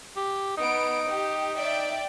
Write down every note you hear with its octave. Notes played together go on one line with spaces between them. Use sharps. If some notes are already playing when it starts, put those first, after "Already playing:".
G4
B3 D#4 D7
G4
D5 E5 G5